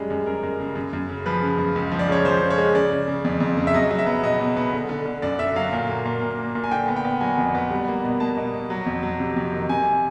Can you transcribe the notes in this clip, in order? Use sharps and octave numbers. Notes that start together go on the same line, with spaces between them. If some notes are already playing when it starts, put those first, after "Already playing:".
Already playing: F#2 G3 G#3
F#2
F#2 A#4
F#2
C#3
F#2
F#2
C#3
F3 B4
C#3
F#2
C#2
F3
D5
C#3 C#5
F3 C5
C#3
C#5
G#3
C#3 D5
C#3
C#3
F2
F2
C#3
E5
F#3 D#5
F#3
E5
B3
B2 D#5
B2
B3
D3
D3
D3
F#2 D5
D3 E5
F#3 F5
A#2
A#3
A#2
A#2
A#3
A#2
G#5
D3 G5
B3
G5
B3
F#3 G#5
F2
B3
G3
A#3
B2
A#3 A5
B2
B2
F#3
F2
F#3
C3
F2
D#3
C3 G#5